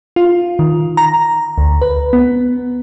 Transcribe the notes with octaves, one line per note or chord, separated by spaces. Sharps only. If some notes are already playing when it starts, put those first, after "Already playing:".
F4
D#3
A#5
D2
B4
B3